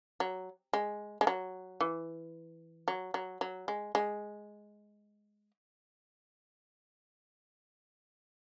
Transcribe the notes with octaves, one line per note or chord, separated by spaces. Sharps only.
F#3
G#3
G#3
F#3
E3
F#3
F#3
F#3
G#3
G#3